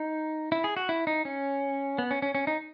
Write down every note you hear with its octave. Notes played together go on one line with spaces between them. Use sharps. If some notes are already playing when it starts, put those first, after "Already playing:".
Already playing: D#4
E4
G#4
F#4
E4
D#4
C#4
B3
C#4
C#4
C#4
D#4